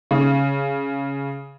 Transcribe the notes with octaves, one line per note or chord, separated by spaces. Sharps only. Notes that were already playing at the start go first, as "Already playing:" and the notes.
C#3